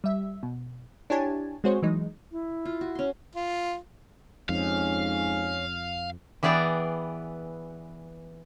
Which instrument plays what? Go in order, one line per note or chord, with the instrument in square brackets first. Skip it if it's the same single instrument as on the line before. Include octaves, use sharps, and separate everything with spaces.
[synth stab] G3 E5
B2
D4 E4 G4 C#5 G#5 A5
G#3 C4 F#4 G#4 C5 C#5
E3 F#3 G#3 D#4
[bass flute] E4
[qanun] F4
F#4
C#4 C6
[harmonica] F4
[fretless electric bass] F2 [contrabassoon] G#2 [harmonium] C#4 [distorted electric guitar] F5
[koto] E3 B3 G#4 D5 G5